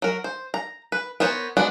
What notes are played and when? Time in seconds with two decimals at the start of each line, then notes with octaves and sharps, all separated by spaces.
0.02 F#3 A#4
0.24 C5
0.54 A#5
0.92 B4
1.20 B3 A#4 C5 C#5
1.57 G#3 B3 D4 F#4